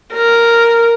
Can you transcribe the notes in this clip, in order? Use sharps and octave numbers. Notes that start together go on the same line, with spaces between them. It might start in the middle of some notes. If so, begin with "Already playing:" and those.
A#4